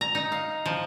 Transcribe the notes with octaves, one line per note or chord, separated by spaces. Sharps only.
A#5
D#4
F5
F3